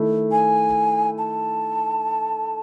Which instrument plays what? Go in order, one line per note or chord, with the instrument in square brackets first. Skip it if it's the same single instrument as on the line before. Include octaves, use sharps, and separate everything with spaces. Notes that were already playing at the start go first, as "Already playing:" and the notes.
Already playing: [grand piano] D#3 A3 E4
[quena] G#5
A5